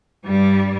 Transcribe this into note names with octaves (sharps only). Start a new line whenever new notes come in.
G2 G3